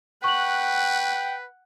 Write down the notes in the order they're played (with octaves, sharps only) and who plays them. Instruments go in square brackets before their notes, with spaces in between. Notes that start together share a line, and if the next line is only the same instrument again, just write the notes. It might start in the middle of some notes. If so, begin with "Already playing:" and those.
[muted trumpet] B4 [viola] F#5 [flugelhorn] G5 [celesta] C#6 F#7